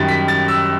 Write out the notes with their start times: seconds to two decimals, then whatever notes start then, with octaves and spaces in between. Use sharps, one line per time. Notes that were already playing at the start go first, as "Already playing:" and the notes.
Already playing: F#2 D#3 G3 A6
0.08 B6
0.28 A6
0.48 E6